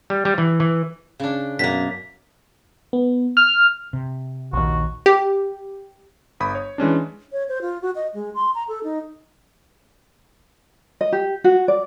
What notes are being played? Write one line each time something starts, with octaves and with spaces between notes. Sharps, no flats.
G3
G3
E3
E3
C#3 D4
F#2 B2 A#3 B6
B3
F6
C3
A#1 D#2 F#4
G4
G1 B5 D#6
C#5
E3 G#3 C#4 D4
C#5
C5
F4
F#4
D#5
G#3
C6
A#5
A4
D#4
D#5
G4
F#4
D5